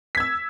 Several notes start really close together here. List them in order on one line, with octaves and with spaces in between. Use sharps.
B6 G#6 E6